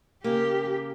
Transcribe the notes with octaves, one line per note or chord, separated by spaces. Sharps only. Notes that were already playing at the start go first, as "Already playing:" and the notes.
C#3 A#3 G4